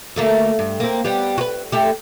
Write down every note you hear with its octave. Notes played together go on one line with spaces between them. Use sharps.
D2 A3 A#3
G2
A#3 C4
G3 B3 G4
F#4 B4
A3 G4